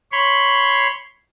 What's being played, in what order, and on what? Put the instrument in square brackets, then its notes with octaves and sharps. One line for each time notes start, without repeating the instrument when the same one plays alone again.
[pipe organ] C#5 B5 C6